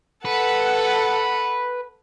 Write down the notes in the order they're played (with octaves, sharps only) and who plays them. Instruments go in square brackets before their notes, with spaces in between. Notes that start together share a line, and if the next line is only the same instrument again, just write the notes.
[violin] A4 F#5 [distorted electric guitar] B4